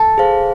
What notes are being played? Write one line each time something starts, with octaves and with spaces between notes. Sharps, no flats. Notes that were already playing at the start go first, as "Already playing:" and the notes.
Already playing: A4
G#4 C5 F5